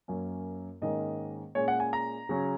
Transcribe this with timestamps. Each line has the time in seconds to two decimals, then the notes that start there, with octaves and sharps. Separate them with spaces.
0.08 F#2 F#3 A#3 C#4
0.82 G#2 D#3 A#3 C#4 D#5
1.55 A#2 G#3 C#4 C#5
1.68 F#5
1.80 G#5
1.93 A#5
2.29 C#3 F#3 C#4